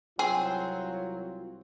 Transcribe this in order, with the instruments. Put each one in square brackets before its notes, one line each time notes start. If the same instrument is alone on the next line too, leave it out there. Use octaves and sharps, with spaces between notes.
[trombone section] C2 F4 [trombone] F#3 [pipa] C4 [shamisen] G#4